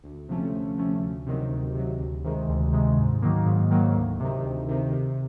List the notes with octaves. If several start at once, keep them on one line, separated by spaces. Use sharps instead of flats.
D2
C3 F3 A3 C#4
D2
C3 F3 A3 C#4
D2
C3 D#3 F#3
D2
C3 D#3 F#3
D2
C3 D#3 G#3
D2
C3 D#3 G#3
G#2
D#3 F#3 A#3
G#2
D#3 F#3 A#3
D2
C3 D#3
D2
C3 D#3
C3